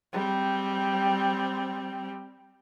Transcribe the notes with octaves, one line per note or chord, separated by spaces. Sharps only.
G3 C4